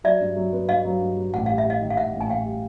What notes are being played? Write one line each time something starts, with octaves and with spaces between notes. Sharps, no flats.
F#3 D5 E5
G2
F#3
B3
G2 D#5 F5
F#3
G2
F#3
A1 F#5
G3 F5
E5
G3 D#5 F5
D#3
F5
A1 E5 F#5
A1
G#5
A1 F5 G5
G3